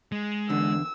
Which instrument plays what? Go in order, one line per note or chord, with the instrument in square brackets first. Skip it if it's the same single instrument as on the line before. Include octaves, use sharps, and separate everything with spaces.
[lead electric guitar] G#3
[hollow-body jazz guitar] E2 D3 [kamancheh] E6